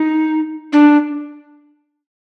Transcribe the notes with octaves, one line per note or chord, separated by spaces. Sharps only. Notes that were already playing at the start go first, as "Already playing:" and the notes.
Already playing: D#4
D4